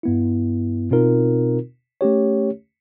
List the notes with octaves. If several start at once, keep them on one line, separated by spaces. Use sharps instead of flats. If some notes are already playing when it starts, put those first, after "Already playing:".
G2 B3 E4
B2 C4 D#4 F4 A#4
A3 C#4 G4 C#5